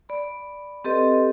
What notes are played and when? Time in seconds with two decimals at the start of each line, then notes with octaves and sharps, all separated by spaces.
0.09 D5 B5
0.84 C4 G4 A4 B4 D#5